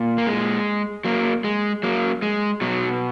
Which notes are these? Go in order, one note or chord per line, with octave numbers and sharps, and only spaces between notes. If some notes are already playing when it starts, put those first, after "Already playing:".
Already playing: A#2
A#3
G#3
F#3 A#3
G#3
F#3 A#3
G#3
B2 F#3